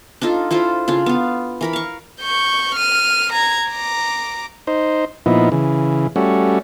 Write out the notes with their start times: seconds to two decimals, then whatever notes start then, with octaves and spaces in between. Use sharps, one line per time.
0.21 D4 D#4 F4 A4
0.51 E4 F4 A4 C5
0.88 C#3 D4 F4
1.06 B3 F5
1.61 E3 A#4 B5
1.73 F5 C#6
2.21 C#6 G6
2.75 F6 D#7
3.33 A#5 G#6
3.68 A#5 D6
4.67 D#4 C5
5.26 A#2 F3 B3 D#4 E4
5.52 C#3 E3
6.16 G3 A3 C#4 F#4